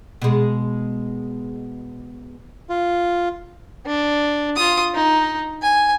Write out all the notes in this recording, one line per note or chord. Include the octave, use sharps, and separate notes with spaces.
B2 G#3
F4
D4
F4 D#6
D#4
G#5